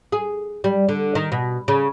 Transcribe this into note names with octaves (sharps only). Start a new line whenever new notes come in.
G#4
G3
D3
D#3
B2
C#3